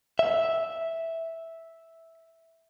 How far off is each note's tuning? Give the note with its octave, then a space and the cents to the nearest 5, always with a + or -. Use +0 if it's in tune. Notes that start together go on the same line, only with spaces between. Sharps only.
E5 -5